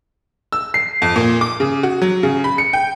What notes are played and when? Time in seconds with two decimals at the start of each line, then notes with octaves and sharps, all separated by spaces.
0.52 E6
0.74 C7
1.02 F2
1.16 A#2
1.41 D6
1.60 C#3
1.83 F#4
2.02 F#3
2.23 C#3
2.44 B5
2.58 C#7
2.73 G5